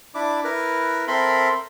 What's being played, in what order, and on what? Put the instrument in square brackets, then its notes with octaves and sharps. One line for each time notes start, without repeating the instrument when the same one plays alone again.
[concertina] D4 E4 D6
E4 A#4 B4
C4 A4 A#4 E5 B5 C6